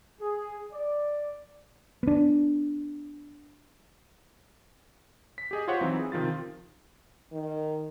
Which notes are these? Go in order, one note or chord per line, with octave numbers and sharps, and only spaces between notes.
G#4
D5
B3 D4
B6
G4 G#4 D#5
F4 G4 C5 C#5 F5 F#5
E3 F#3 C4 D#4
E4 G#4
C3 D#3 F3 F4 A6
D#3